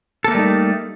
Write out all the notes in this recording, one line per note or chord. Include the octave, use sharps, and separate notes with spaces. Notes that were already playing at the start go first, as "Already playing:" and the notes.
G3 A3 A#3 D#4 A4